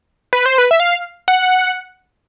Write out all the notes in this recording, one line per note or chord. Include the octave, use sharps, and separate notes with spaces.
B4
C5
B4
E5
F5
F#5